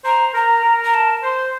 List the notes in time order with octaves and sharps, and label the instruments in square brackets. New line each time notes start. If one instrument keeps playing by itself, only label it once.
[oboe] C5 [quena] A#5
[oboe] A#4 [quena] A#5
[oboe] A#4
[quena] A#5
A5
[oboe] C5 [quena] C6